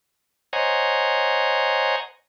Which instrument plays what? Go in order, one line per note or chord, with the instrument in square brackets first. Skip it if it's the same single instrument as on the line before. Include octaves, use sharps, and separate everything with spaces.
[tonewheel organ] C5 C#5 D#5 F#5 G#5 A#5